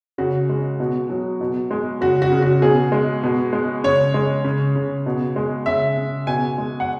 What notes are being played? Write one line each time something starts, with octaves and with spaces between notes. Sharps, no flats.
C#3 F#4
G#3
B2
F#3
B2
G#3
C#3 F#4
F#4
C#3
F#4
B2 G#4
G#3
B2
G#3
C#3 C#5
G#3
C#3
C#3
B2
G#3
C#3 E5
C#3
B2 G#5
G#3
F#5